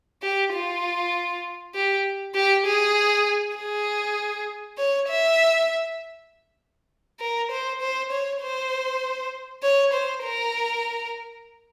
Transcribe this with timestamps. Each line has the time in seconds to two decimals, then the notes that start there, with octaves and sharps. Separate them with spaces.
0.23 G4
0.54 F4
1.75 G4
2.35 G4
2.66 G#4
3.57 G#4
4.78 C#5
5.09 E5
7.20 A#4
7.51 C5
7.81 C5
8.11 C#5
8.41 C5
9.63 C#5
9.93 C5
10.24 A#4